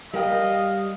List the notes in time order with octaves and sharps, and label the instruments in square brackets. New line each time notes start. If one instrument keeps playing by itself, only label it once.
[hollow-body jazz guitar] G3 A#4 G5 [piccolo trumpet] D#5 [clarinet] F5